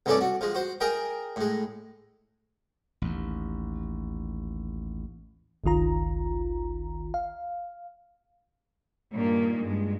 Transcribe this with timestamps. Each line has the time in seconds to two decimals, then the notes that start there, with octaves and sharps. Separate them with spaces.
0.06 C2 G2 A3 C#4 A4 D5
0.21 F#4
0.41 F3 G#3
0.55 F#4 C5
0.81 G#4 A#4 D#5 G5
1.36 A2 G#3
3.02 A1 D#2
5.64 G1 C#2 D#3 F4 A#5
7.14 F5
9.13 G2 A#2 D#3 A#3
9.62 G2 G#3